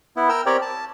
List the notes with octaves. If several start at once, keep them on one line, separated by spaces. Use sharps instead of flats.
B3 E4
A#4 G5 E6
C4 G4 A#4 C#5 D5 G5
A5